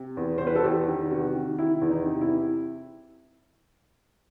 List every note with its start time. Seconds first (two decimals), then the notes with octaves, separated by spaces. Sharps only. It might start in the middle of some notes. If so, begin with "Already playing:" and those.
Already playing: C3
0.17 E2
0.38 E2 C5
0.47 B4
0.56 A4
0.64 E2 G4
0.88 D#3
1.11 C3 F#4
1.35 D#3
1.58 D#3 E4
1.82 E2
1.90 D#4
2.06 C3
2.21 E4